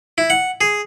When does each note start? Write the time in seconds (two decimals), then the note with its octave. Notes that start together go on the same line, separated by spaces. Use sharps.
0.18 E4
0.30 F#5
0.61 G#4